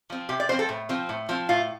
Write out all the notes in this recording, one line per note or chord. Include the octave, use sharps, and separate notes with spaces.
F3 C4
C3 G4
D5
F3 C4 C5
A4
A2
F3 C4
A2
F3 C4
A2 F4